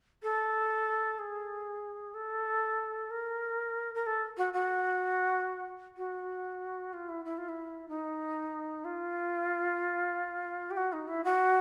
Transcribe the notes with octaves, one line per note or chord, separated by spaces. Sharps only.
A4
G#4
A4
A#4
A#4
A4
F#4
F#4
F#4
F4
E4
E4
F4
E4
D#4
F4
G4
F#4
D#4
E4
F#4